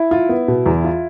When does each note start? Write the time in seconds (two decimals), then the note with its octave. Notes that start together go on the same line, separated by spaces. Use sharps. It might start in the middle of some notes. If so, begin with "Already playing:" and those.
Already playing: E4
0.11 F4
0.29 B3
0.48 B2
0.66 E2
0.84 F4